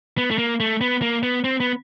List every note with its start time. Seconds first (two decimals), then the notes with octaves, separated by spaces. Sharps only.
0.18 B3
0.31 A3
0.38 A#3
0.60 A3
0.81 B3
1.02 A#3
1.23 B3
1.44 C4
1.60 B3